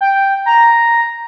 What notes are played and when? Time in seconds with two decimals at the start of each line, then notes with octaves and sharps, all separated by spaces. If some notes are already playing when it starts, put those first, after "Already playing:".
0.01 G5
0.46 A#5